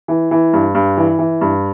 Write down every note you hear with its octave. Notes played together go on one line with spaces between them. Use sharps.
E3
E3
G2
G2
E3
E3
G2